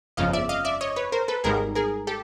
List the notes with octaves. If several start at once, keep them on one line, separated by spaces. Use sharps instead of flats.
G1 F2 C#3 F3 D#5 F5
D5 E5
D#5 F5
D5 E5
C#5 D#5
B4 C#5
A#4 C5
A4 B4
G#1 G#2 D#3 G3 G#4 A#4
G#4 A#4
G4 A4